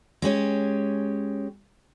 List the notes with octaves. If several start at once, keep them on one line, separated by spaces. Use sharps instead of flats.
G#3 C#4 G4 C#5